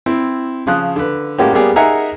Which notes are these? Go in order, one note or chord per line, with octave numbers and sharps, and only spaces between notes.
C4 E4
C#3 F3 D#6 F#6
D3 B4
A2 G#3 A#3 C#4 F#4 G4
G3 A#3 B3 G4 G#4
D#4 G#4 A#4 E5 F#5 G#5